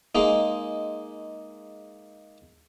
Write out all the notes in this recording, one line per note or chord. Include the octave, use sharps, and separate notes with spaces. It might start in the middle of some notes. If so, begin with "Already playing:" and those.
G#3 A#3 D#4